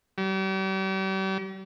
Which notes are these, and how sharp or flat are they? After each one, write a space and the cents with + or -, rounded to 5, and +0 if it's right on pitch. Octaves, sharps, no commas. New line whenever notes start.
G3 -40